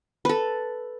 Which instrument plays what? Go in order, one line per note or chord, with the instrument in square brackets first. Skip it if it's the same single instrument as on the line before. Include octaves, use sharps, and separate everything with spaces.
[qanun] A4 B4